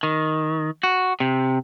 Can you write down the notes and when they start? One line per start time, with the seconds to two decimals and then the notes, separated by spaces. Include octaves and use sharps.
0.03 D#3
0.83 F#4
1.20 C3